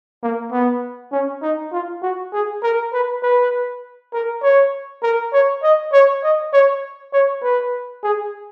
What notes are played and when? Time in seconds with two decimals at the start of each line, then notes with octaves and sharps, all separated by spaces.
0.23 A#3
0.52 B3
1.12 C#4
1.43 D#4
1.73 F4
2.02 F#4
2.33 G#4
2.63 A#4
2.93 B4
3.23 B4
4.14 A#4
4.42 C#5
5.03 A#4
5.33 C#5
5.63 D#5
5.93 C#5
6.23 D#5
6.53 C#5
7.13 C#5
7.43 B4
8.04 G#4